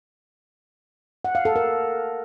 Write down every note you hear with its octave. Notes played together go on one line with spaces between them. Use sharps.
F#5
F5
A4
A#4